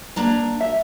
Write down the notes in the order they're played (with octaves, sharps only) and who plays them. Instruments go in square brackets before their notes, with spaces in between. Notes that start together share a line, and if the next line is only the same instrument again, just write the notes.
[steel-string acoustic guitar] A#3 D4 A#5
[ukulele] E5